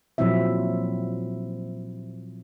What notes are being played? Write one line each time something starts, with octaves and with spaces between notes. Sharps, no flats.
A#2 F3 F#3 C4 E4 E5